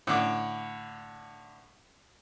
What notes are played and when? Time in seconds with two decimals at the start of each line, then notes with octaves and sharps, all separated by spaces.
0.07 A2 D3 D6